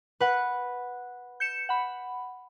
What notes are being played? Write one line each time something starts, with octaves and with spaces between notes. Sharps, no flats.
B4 F#5
G6 C#7 E7
F#5 B5